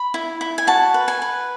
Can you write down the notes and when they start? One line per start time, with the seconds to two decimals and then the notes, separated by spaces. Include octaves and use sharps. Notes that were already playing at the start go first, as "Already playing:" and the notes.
Already playing: B5
0.14 E4
0.41 E4
0.58 G#5
0.67 F#4 A5
0.94 B4
1.08 G#5
1.22 B4